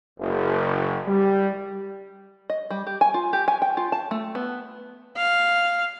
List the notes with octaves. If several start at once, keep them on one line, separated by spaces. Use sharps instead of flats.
F#1
G3
D#5
G3
G4
G#5
F4
G4
G#5
G5
F4
A5
A3
B3
F5